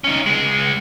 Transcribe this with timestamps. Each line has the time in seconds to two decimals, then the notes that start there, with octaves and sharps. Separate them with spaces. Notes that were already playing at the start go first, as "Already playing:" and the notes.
0.04 C#4 D#4
0.27 C#2 G#3